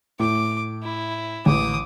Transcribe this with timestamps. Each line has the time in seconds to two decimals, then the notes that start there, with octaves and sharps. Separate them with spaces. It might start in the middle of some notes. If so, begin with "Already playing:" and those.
0.20 A2 D6
0.83 E4
1.46 A1 D6 D#6